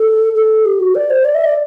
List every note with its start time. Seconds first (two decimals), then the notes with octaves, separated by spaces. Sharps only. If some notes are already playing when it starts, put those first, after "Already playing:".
Already playing: A4
0.35 A4
0.65 G4
0.80 F#4
0.95 D5
1.10 C5
1.25 D5
1.35 E5
1.44 D5